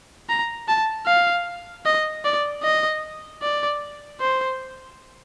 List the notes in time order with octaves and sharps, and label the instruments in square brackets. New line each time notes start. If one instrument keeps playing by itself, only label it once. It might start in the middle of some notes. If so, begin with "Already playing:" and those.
[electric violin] A#5
A5
F5
D#5
D5
D#5
D5
C5